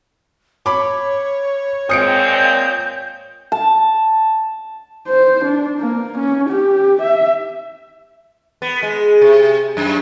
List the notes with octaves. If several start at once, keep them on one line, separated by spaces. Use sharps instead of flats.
C#5 B5 D6
A#2 G#3 C4 D#6 G6 C#7 D7
A5
C5
D4
A#3
C#4
G4
E5
B3
G#3
C3
F#2